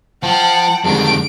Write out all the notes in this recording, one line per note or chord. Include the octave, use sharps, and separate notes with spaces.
F3 F#5 G5 A5
F2 D3 D#3 G3 G#3 D7